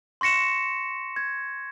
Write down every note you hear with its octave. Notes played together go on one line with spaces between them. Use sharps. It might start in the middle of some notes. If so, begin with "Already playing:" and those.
C6 C#6 A#6 C#7 E7
G#6